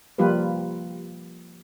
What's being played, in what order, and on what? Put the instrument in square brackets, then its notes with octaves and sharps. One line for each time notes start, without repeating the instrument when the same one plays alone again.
[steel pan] F3 G3 A#3 F4 G4 B4